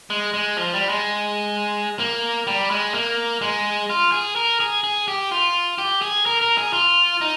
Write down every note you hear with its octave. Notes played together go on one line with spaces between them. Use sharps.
G#3
G#3
F3
G3
G#3
A#3
G3
G#3
A#3
G#3
F4
G#4
A#4
G#4
G#4
G4
F4
G4
G#4
A#4
A#4
G#4
F4
D#4